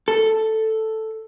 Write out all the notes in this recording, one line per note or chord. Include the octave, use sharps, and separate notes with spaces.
A4